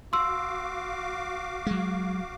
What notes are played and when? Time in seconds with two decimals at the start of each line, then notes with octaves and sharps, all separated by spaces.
0.13 F#4 F5 C6 D6 E6
1.66 F#3 G#3